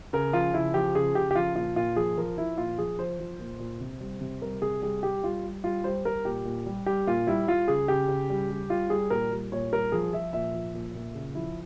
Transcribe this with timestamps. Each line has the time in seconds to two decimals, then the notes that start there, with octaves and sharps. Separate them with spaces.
0.13 C#3 A#4
0.33 F3 F4
0.54 C#3 E4
0.74 F3 G4
0.95 C#3 G#4
1.15 C#3 G4
1.31 G4
1.35 F3 F4
1.55 A#2 F4
1.76 A#2 F4
1.96 F3 G#4
2.18 F3 A#4
2.38 F3 E4
2.58 A#2 F4
2.78 F3 G#4
2.98 F3 C5
3.19 F3
3.39 A#2
3.59 A#2
3.80 C3
4.00 G3
4.21 C3
4.42 G3 A#4
4.62 C3 G#4
4.82 G3 G#4
5.03 G3 G4
5.23 G3 F4
5.43 G3
5.64 G3 F4
5.84 G3 C5
6.05 G3 A#4
6.25 A#2 G4
6.45 A#2
6.66 G3
6.86 G3 G4
7.07 A#2 F4
7.27 G3 E4
7.47 G3 F4
7.68 C#3 G#4
7.88 C#3 G4
8.08 C#3
8.30 G3
8.50 G3
8.70 G3 F4
8.90 G3 G#4
9.10 A#2 A#4
9.31 G3
9.52 A#2 C#5
9.72 G3 A#4
9.92 F3 G#4
10.13 F3 E5
10.33 A#2 E5
10.54 F3
10.74 A#2
10.95 A#2
11.15 C#3
11.35 F3 E4